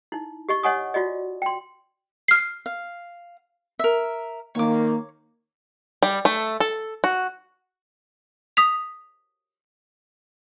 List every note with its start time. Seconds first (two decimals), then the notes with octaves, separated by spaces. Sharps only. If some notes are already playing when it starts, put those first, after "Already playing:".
0.12 D#4 E4
0.49 G4 D#5 C#6
0.63 C#5 D#5 F#5 G#5 C#6 D#6
0.94 F4 F#4 D5 D#5
1.42 G5 C6
2.28 F6 C7
2.66 F5
3.79 A#4 E5
4.55 D#3 A#3 C#5 D6
6.03 G3
6.25 A3
6.60 A4
7.04 F#4
8.57 D#6 B6 F7